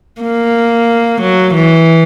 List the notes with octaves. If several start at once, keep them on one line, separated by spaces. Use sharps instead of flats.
A#3
F#3
E3